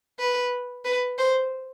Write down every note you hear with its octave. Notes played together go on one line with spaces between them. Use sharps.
B4
B4
C5